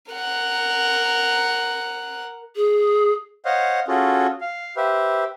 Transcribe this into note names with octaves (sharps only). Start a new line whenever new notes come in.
A#4 F#5
G#4
C5 C#5 D#5 F5 F#5
C#4 F4 F#4 G#4 A4
F5
G4 B4 C5 E5